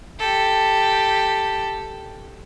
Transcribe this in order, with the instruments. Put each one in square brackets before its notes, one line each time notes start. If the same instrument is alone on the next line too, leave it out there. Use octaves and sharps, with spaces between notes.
[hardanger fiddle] G4 A4